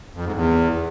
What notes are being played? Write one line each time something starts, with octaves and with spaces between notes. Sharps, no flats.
F2
G#2
E2